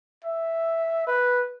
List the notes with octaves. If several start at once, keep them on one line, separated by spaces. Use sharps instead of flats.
E5
B4